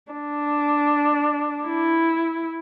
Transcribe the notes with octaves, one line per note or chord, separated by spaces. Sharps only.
D4
E4